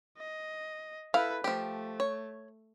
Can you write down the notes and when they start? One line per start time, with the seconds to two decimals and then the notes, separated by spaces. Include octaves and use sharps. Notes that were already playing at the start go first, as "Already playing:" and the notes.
0.18 D#5
1.14 E4 A4 B4 F5
1.44 F3 A3 G4
2.00 C#5